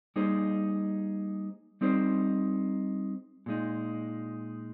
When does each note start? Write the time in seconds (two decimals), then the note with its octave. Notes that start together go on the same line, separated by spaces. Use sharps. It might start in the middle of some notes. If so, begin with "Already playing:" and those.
0.16 G3 A#3 D#4 G#4 C5
1.81 G3 C4 D#4 G#4 C5
3.46 A#2 G#3 D#4